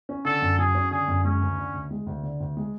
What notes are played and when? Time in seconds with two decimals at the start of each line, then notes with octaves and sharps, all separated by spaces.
0.09 C#4
0.25 D3 A4
0.42 F#2
0.58 F#3 G#4
0.75 C#4
0.91 D3 G#4
1.08 F#2
1.24 G#3 C#4
1.41 D2
1.58 D3
1.74 D2
1.91 G#3
2.06 D2
2.23 D3
2.40 D2
2.57 G#3